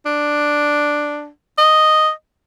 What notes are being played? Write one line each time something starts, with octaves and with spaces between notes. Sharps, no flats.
D4
D#5